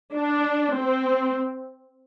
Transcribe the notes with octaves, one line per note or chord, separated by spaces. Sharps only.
D4
C4